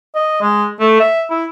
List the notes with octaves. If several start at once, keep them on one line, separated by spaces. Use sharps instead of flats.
D#5
G#3
A3
E5
E4